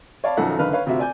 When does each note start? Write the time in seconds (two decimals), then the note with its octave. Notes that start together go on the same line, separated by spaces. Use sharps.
0.24 C#5 D5 F5 A5 B5
0.37 B1 F#2 D#3 F3 A4 F#5
0.59 F#1 D3 D#3 B4 F5 F6
0.73 B4 C#5 F5
0.86 D2 C3 F4 F#4 E5
0.99 D5 G#5 G6